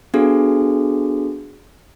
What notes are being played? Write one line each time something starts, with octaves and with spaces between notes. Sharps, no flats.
B3 D4 F#4 G#4 A4